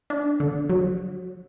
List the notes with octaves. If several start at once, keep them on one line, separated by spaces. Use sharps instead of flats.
D4
D3
F#3